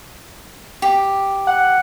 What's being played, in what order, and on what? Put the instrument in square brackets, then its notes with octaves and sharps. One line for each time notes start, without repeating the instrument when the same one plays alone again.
[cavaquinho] G4
[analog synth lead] F#5